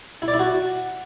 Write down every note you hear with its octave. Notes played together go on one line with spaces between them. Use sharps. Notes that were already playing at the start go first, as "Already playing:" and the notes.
E4
D5
E4
F#4